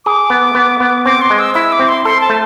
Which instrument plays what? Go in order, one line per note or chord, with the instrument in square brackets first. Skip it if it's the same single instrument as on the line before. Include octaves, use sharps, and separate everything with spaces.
[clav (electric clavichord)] G#4 [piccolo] D6
[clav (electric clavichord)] B3
B3
B3
[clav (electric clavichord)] C4 [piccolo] D6
[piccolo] C6
[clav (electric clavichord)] G#3
[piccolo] E6
[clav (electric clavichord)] E4 [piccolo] E6
[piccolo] D6
[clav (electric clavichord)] C4
[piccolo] C6
[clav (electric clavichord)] A4 [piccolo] C6
[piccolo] A5
[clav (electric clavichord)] A3